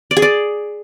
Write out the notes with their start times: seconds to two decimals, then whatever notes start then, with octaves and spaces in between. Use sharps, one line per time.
0.11 D5
0.17 G#4
0.22 D5